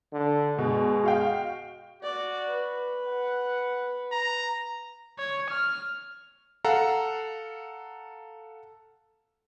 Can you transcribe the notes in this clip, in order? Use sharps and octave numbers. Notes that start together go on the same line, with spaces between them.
D3
B2 G#3
F#4 F5 G5
F#4 D5
B4
F#5
A#5
C#5
F6
A4 F5 F#5 A#5